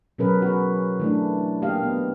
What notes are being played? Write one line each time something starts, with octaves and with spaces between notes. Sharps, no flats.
B2 F#3 C#4 G#4 A#4 B4
F#4 B4
E3 A3 D4
A#3 G4 D#5 F5
B3